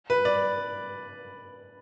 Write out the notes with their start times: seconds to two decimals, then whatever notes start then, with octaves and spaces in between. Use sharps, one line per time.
0.10 B4
0.25 D5